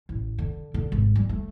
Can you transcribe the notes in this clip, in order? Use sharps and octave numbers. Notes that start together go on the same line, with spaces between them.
A1
D3
D3
G#1
G3
A3